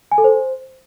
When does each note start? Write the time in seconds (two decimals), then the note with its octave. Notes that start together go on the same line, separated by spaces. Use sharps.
0.12 G#5
0.18 A4
0.24 C5